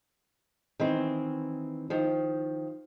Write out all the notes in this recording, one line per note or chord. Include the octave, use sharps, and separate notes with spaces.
D#3 E3 C4
D#3 F3